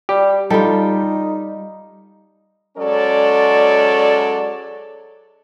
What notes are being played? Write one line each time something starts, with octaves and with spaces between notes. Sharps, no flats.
G3 G4
G3 D#4 F4 A4
F#3 G#3 C#4 A4 D5